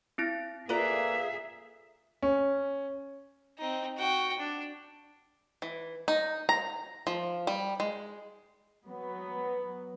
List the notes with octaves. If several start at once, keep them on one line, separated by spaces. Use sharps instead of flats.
C4 E4 A#6
A#3 F4 G#4 A4 B4 D5 E5 A#5
C#4
C4 D#4
F#4 G5
D4
E3
D#4
A#5
F3
G3
G#3
F#3 B3